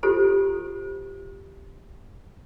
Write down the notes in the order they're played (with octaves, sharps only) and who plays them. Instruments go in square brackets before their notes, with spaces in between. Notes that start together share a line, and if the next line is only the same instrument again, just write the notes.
[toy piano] E4 F4 G4 A4 C5